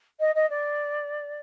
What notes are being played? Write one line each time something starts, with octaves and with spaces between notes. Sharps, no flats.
D#5
D#5
D5